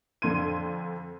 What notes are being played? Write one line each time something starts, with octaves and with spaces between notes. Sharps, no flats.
F2 D3 C6 G#6 D#7